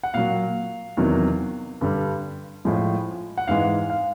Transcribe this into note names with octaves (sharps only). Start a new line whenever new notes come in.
F#5
A#2 F#3 F5
E2 C3 D#3 F#3
G2 D3 G3
A2 F3 G#3
F#5
G#2 E3 G#3 F5
F5